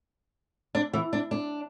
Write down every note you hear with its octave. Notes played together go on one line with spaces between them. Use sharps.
D4
E3
D4
D4